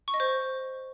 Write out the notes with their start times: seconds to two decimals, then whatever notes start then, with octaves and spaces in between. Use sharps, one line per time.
0.08 C#6
0.14 D#5
0.20 C5